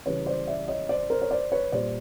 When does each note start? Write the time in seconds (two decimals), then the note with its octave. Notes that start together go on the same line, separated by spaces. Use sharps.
0.06 C#3 E3 G3 B4 C#5
0.26 C5 D5
0.47 D5 E5
0.68 C#5 D#5
0.89 C5 D5
1.10 A#4 C5
1.22 C#5
1.31 C5 D5
1.52 B4 C#5
1.72 A#2 G3 C5 D5